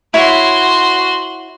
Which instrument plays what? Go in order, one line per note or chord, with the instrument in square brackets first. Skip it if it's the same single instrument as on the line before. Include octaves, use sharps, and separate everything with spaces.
[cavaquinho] E4 C#5 [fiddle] F#4 C6